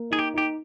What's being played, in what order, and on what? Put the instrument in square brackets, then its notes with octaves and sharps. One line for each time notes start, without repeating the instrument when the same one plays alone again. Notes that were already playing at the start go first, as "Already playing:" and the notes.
Already playing: [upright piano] A#3
[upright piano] D#4 [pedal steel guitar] G#4
[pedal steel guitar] G4
[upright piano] D#4 [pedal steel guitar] G4